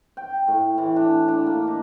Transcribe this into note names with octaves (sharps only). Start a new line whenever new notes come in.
G5
A2
E3
D4
D4
A#3
D#4